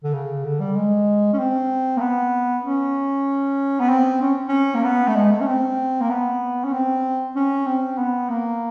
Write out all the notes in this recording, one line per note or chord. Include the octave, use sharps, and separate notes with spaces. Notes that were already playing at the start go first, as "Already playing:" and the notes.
D3
C#3
D3
G3
G#3
C#4
C4
A#3
B3
C#4
B3
C4
C#4
C#4
A#3
B3
A3
G#3
A3
C#4
C4
A#3
B3
C#4
C4
C#4
C4
B3
A#3